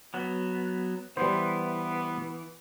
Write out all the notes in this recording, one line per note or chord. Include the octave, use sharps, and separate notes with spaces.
F#3 B3
E3 G3 B3 C5